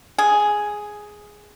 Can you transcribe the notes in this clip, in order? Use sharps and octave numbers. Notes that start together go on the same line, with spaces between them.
G#4